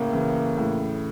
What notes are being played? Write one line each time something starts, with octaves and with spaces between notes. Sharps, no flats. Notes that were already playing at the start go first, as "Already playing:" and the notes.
Already playing: A2 C#3 A#3
C#3 E3
A2 C#3